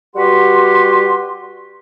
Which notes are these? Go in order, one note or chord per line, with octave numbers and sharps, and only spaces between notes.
G3 F#4 G4 B4 F#5 C6